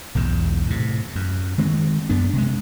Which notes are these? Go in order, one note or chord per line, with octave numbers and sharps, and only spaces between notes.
B1 E2 G#2
A2 C3
F#2
D#3 G#3 C4
F#2 B3 D4
C3 G#3